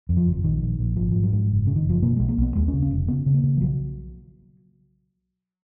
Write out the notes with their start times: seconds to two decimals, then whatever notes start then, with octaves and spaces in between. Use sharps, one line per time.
0.09 F2
0.17 F3
0.26 F#1
0.32 F3
0.44 A#1 D#3
0.62 A#1
0.79 A#1
0.96 G#1 F3
1.11 G#2 F3
1.23 F#3
1.32 G#2
1.50 F#1
1.67 C#3
1.76 D#3
1.85 F#1 F3
2.02 B2 A#3
2.16 B1 G#3
2.28 A#3
2.38 B1 B3
2.55 D#2 G#3
2.68 C#4
2.73 C#3
2.82 C#4
2.91 F1
3.08 C#3 B3
3.26 C#3
3.34 A#3
3.43 C#3
3.57 F3
3.61 B1 F#3